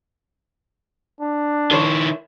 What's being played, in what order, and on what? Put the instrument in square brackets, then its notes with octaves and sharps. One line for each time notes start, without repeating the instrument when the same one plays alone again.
[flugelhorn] D4
[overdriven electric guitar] D#3 E4 [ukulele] A4 C5 C#5